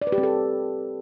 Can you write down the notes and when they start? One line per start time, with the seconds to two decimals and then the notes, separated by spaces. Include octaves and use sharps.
0.02 D5
0.07 B4
0.12 G4
0.18 C4
0.23 A4